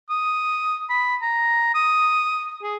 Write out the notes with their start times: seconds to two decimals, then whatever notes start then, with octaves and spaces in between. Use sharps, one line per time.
0.09 D#6
0.90 B5
1.22 A#5
1.75 D#6
2.63 G#4